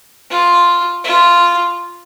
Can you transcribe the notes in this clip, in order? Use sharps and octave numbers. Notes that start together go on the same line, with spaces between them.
F4
F4